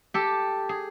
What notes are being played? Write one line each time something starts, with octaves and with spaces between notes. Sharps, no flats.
G4 A4
G#4